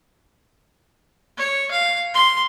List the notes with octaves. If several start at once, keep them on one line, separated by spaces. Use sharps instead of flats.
C#5
F5
C6